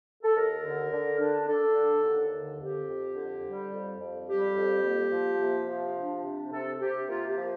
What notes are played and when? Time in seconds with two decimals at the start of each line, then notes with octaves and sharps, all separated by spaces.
0.24 A4
0.36 D#2 A#4
0.63 D3
0.92 D3
1.19 D4
1.48 D4 A4
1.76 D3
2.04 D#2
2.32 D3
2.60 F2 G4
2.88 F2
3.16 D3
3.44 G3
3.72 F2
4.00 F2
4.28 G3 G4
4.56 F2
4.84 A#3
5.13 F3
5.41 C3
5.69 F3
5.96 D4
6.24 C3
6.53 C3 A4
6.81 C3 G4
7.09 A#3 F4
7.28 G4
7.36 F3